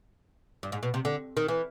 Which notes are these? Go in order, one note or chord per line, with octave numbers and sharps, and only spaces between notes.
G2
G#2
B2
C3
D3
D#3
E3